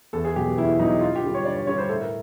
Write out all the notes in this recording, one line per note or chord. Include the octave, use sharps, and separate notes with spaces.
E2 A4
G#4
B2 F#3 G4
E2 E4
B2 F#3 D#4
G2 F4
G4
D3 G3
C#5
G2 D5
C#5
D3 G3 C#5
C5
A2 A4
A#4